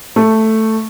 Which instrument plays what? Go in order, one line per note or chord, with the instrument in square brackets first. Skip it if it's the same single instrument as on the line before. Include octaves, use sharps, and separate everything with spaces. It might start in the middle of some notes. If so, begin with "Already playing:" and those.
[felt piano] A3